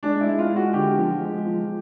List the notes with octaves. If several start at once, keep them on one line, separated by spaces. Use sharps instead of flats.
G#3 D4
E4
G#3
F4
G#3
F#4
D3 G4
F3
G#3
F3